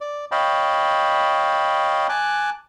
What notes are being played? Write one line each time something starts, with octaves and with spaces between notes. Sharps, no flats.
D5
C#5 D#5 F5 G5 A5 B5
G#5 A5 D6 F#6